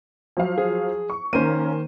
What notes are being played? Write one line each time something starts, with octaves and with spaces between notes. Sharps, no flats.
F3 F#3 F5
G#4
C#6
D#3 A#3 C#4 C5 D#7